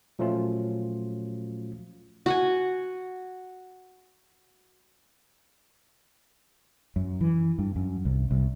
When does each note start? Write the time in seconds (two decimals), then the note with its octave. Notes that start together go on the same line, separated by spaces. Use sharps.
0.19 A#2 F3 F#3 A3 C#4 F4
2.26 F#4 F#5 G#5
6.96 F#2
7.21 E3
7.59 G2
7.76 F#2
8.05 C2
8.31 C2